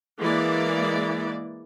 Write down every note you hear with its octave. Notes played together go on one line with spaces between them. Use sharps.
E3 G#3 A#3 D5